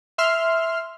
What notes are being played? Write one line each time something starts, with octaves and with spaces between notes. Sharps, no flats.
E5 C6 F6